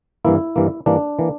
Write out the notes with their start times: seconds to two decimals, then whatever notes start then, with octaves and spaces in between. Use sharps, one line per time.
0.25 G2 E3 A#3 E4
0.56 G2 E3 A#3
0.86 G2 E3 A#3 D4
1.19 E3 A#3